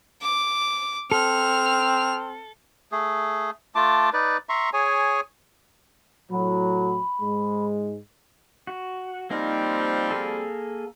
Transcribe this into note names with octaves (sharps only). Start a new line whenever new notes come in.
D6
C4 A4 F6
A3 G#4
A3 F4 A5 D6
D#4 B4 D5
E5 A#5 C6 C#6
G#4 C#5 G#5
A2 F#3 B5
G#2 G#3
F#4
F3 G3 A#3 C4 D#4
A#3 G#4 A4